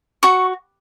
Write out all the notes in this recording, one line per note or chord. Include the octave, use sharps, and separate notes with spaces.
F#4 C#6